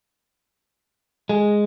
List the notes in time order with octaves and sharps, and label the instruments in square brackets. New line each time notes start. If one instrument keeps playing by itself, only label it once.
[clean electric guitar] G#3